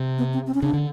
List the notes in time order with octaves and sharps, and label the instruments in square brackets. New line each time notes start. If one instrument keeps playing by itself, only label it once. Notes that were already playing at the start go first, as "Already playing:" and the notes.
Already playing: [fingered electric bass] C3
[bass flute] B3
C4
C4
C#4
[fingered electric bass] C#3 [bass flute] D4
[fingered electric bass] D3